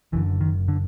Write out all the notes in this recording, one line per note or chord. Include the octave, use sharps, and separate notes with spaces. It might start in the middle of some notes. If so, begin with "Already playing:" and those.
F#1 F#2 D3 E3
D#3
D3